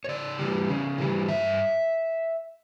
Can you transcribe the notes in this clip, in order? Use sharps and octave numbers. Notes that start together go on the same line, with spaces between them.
C#5
C#3 D5
E3 G3
C#3
E3 G3
G2 E5